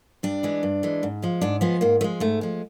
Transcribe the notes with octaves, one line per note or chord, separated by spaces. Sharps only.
G2 D4
E3 G#3
G2
E3 G#3
G#2
F3 G#3
G#2 D4
F3 G#3 B3
G#2 A#3
F3 G#3 A3
G#2 A3
F3 G#3